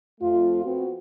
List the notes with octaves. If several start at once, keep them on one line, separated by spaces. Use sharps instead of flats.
F2 A3 F4
B3 C4 F#4